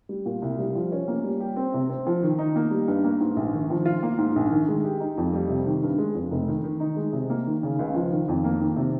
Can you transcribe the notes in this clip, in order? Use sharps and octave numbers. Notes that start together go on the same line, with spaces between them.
G3
A#2
C2
G3
F3
C#4
A#3
G3
G4
C4
C3
C4
F3
D#3
D#4
A#3
G3
G2
A#3
G#2
A#1
D#3
F3
F4
A#3
G#2
A#1
D#3
G#3
G4
D#4
F2
G3
C3
D#3
G2
G#3
F2
F1
D#3
D#3
D#4
G#3
C3
A#3
D#3
C#3
C#2
F3
D#3
F2
A#3
D#3
C3